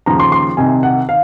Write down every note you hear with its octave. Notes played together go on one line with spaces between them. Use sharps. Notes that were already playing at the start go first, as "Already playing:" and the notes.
D#2 C#3 F3 A#5
C6
C6
C2 C3 D#3 G#5
F#5
D#3 F5